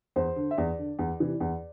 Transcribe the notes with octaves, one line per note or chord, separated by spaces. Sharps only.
E2 C5
D3
E5
E2 D5
D3
E2
C3 E3
E2